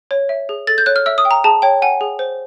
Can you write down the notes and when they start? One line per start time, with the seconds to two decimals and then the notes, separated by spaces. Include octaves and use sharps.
0.11 C#5
0.29 E5
0.49 G#4
0.67 A4 A6
0.78 G6
0.86 C#5 F#6
0.96 F6
1.06 E5 E6
1.18 D#6
1.25 G5
1.31 A#5
1.44 G#4 A5
1.62 C#5 G5
1.82 F#5 G#5
2.01 G#4
2.19 C5